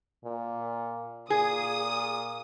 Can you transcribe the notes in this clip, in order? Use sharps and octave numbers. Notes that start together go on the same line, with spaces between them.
A#2
A#2 G#4 D#6